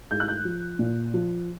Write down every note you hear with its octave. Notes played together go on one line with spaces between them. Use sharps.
G#2 G6
F#6
G6
F3
A#2
F3